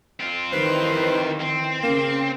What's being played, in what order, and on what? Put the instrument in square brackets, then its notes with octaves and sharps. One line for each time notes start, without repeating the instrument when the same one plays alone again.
[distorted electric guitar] C4 F4
[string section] D#3 E3 [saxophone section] G3 B4 C5
[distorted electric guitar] C4
[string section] C#3 [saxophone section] A#3